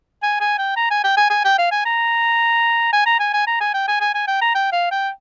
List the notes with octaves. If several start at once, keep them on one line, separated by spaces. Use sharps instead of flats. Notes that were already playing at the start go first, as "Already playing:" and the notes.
G#5
G#5
G5
A#5
G#5
G5
G#5
G#5
G5
F5
G#5
A#5
G#5
A#5
G#5
G#5
A#5
G#5
G5
G#5
G#5
G#5
G5
A#5
G5
F5
G5